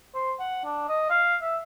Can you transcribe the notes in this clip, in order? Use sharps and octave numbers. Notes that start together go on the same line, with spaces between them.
C5
F#5
D4
D#5
F5
E5